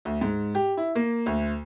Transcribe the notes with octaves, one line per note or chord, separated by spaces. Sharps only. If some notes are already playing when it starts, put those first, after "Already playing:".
D2
G#2
G4
E4
A#3
D2